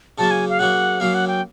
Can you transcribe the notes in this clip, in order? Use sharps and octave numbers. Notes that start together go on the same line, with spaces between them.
C#3 F#3 A#3 A5
G#5
F5
C#3 F#3 A#3 F#5
C#3 F#3 A#3 F5
F#5
G5